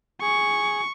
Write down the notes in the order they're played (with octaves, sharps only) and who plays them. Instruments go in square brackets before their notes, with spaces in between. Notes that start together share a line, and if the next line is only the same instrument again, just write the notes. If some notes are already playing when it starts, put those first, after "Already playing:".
[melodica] G#4 [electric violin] C#6